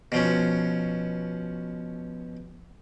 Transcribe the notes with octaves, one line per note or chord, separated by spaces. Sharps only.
B2 F3 C#4